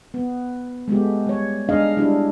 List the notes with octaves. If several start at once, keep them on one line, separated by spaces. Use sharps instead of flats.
B3
G#3 A3 B3 G4
G3 C#5
G#3 D4 D#4 G#4 D#5 F5
G3 D4 E4 G4